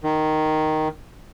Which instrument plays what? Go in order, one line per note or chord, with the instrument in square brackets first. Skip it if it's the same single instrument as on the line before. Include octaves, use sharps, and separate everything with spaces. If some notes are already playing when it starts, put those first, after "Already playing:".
[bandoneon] D#3